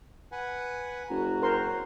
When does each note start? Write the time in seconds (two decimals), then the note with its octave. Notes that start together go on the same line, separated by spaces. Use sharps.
0.32 B4 F#5 G#5
1.10 F#1 F#4 A#5
1.42 C4 A#4 C5 C#5 C6